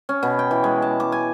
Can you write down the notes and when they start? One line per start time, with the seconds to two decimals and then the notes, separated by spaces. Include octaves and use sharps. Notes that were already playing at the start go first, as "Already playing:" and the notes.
0.09 C#4
0.23 B2
0.39 G5
0.51 E3
0.64 G#3
0.82 A5
1.00 D6
1.12 G#5